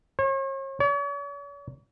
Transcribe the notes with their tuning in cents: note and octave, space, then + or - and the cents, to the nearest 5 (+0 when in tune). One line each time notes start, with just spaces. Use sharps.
C#5 -40
C#5 +45